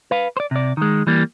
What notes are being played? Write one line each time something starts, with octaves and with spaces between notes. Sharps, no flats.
B4 F5
C5 D5
C3 D5
D#3 G#3
E3 G3 A#3